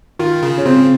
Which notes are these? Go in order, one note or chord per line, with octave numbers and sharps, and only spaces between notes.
D#3 F4
C#3
C#4
C#3 C4